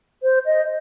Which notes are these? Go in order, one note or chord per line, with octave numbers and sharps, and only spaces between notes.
C5
D#5